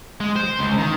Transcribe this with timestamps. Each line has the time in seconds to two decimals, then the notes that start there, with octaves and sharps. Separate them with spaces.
0.21 G#3
0.36 C5
0.59 C#2
0.78 D#3